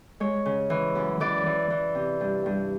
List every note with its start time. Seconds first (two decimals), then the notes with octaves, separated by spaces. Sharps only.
0.20 G#3 C#5
0.45 C#3
0.70 E3
0.95 F#2
1.20 E3 D5
1.46 E3
1.70 E3
1.95 C3
2.21 G2
2.46 G2